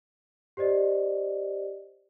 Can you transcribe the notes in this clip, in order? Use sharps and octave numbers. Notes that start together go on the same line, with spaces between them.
G4 C5 D5 D#5